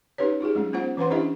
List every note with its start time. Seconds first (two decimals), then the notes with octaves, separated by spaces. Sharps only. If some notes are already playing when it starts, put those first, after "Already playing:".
0.18 C#4 D#4 G4 B4 C#5
0.41 D#4 F4 G4 G#4
0.55 F#3 G#3 C#4
0.73 B3 C#4 F4 C5 F#5
0.97 E3 C#4 B4 C5 F#5 C6
1.11 C#4 D4 E4 G4 D#5 E5